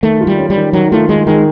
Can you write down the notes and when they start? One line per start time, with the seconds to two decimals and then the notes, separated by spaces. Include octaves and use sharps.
0.02 D#3 A3
0.21 F4
0.27 G3
0.38 C#4
0.50 G3
0.56 D#3
0.73 D#3 F#3
0.92 A3 F4
1.09 D#3 G#3
1.27 D#3 G#3